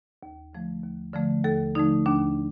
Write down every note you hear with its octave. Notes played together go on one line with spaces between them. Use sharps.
D#2
D3 F3 A3
D#2
D3 F3 A3
D#2 A4
D3 F3 A3 D#4
D#2 D4